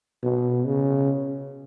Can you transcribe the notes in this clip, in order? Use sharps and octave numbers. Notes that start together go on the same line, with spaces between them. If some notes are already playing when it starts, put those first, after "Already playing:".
B2
C#3